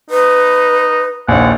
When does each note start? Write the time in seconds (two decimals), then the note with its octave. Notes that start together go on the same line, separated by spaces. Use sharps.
0.10 D#4 B4
1.28 A#1 D#2 F#5